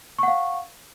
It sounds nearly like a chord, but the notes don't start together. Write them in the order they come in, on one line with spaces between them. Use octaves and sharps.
C#6 F#5 F5